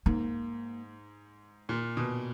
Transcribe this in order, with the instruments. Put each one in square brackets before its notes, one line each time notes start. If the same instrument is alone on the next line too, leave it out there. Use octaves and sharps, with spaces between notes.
[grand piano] G#2 [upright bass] A#3
[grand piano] A#2
B2